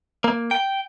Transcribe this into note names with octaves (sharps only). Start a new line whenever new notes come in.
A#3
G5